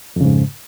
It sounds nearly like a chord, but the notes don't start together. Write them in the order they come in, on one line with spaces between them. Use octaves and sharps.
F2 C#3 G#2